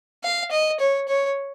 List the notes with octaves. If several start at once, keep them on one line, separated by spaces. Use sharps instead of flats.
F5
D#5
C#5
C#5